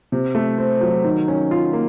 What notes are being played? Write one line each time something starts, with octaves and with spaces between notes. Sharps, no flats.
C3
A3
C4
F#3
D#3
C#4
F4
A#3